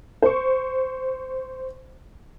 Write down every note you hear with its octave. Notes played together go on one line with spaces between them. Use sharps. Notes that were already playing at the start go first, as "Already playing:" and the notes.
C5 C#6